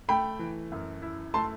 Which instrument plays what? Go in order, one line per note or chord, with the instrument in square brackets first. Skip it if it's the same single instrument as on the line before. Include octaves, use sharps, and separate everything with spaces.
[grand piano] A3 [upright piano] G5 B5
[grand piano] E3
F#2
E4
[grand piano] A3 [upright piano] A5 C6